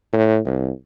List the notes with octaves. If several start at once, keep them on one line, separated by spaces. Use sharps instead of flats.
A2
C2